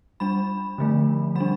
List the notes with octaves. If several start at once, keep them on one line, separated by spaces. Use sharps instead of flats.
G3 D4 B5
D3 F3 A3
G3 B5
D4